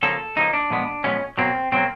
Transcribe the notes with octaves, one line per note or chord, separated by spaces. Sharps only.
C#3 F3 A#3 A4
C#3 F3 A#3 D#4
D4
A#2 F3 G#3 B3
A#2 F3 G#3 B3 C#4
B2 F#3 A#3 C4
B2 F#3 A#3 C4